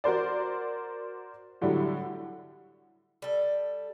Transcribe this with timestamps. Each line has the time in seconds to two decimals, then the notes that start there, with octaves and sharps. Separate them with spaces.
0.04 F#4 A#4 C5 D5
1.61 A2 D3 F#3 G3
3.22 G3 A4